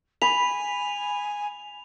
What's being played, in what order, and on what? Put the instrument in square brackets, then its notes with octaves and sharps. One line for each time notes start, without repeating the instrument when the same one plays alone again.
[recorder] G#5 [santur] B5 [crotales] F7